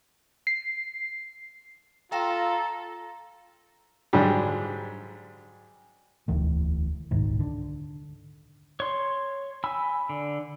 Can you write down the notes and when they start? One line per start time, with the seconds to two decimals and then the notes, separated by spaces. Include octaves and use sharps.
0.47 C7
2.12 F4 A4 F5 G5 A#5 E7
4.13 G#2 D3 F#3 G3
6.28 E1 D2 E3 A3
7.11 D#1 C2 G#2 D#3
7.40 D3
8.80 C#5 C6
9.64 G#5 B5 E6
10.09 D3